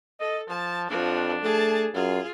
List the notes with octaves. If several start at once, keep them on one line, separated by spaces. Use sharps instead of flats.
A4 D#5
F3 A5
F2 F3 D4 F#4
A3 G#4 A5
F#2 F4 G#4